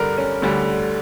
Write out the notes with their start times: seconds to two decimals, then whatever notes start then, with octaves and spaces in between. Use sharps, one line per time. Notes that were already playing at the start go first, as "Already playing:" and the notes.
Already playing: G2 D3 G3 A#4 D5
0.18 C#4
0.42 D2 D3 G3